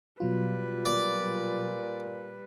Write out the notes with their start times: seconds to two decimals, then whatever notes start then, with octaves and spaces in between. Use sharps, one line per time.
0.20 B2 F#3 G3 F4 B4
0.86 A#2 D5